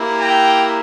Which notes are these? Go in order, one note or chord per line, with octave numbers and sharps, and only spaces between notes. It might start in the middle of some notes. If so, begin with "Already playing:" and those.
Already playing: A#3 E4 G4
G5 A#5